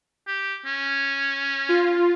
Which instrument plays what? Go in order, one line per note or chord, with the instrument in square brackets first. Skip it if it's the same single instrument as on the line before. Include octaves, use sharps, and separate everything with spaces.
[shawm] G4
C#4
[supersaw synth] F4